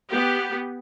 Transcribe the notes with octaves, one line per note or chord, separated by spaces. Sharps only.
B3 G4